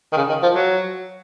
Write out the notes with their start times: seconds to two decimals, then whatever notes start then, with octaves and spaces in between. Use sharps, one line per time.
0.12 D#3
0.17 C#3
0.28 D#3
0.42 F3
0.55 F#3